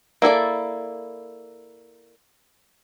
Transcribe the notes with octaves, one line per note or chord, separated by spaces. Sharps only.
A#3 E4 A4 D5